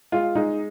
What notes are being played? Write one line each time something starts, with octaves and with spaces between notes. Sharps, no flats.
G#3 F4
G#3 D#4